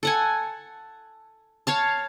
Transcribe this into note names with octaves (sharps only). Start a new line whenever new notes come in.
A4 F#5 G#5
C#5 F5 A5